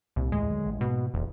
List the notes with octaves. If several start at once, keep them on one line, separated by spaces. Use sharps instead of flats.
C2 A#2
D#2 A2 D#3 G#3
D3 D#3 F#3
A1
G#2 B2 A3 A#3
D#1 E2